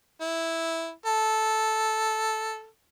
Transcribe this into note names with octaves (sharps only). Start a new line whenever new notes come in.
E4
A4